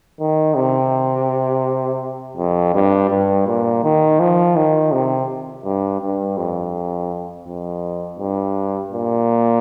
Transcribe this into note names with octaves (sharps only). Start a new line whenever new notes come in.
D#3
C3
F2
G2
G2
A#2
D#3
F3
D#3
C3
G2
G2
F2
F2
G2
A#2